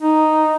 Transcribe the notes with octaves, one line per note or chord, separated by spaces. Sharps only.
D#4